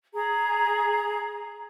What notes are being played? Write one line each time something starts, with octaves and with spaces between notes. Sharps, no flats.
G#4 A#5